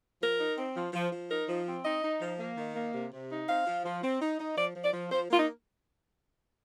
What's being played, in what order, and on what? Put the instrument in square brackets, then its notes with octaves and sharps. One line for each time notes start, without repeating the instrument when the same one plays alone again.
[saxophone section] F3 A#4
D#4
C4
F3
F3
F3
D#4 A#4
F3
C4
D#4 D#5
D#4
F3
A#3
D#3
A#3
C3
C3
D#4
C4 F5
F3
F3
C4
D#4
D#4
F3 D5
F3
D5
F3
F3 C5
A#3 F4
D#4